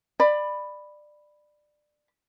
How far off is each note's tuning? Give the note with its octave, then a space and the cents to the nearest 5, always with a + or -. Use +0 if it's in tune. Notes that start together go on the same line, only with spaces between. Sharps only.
D5 +20 B5 +0